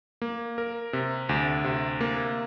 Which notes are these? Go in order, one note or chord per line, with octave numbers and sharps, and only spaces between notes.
A#3
A#4
C3
D2
C3
A#3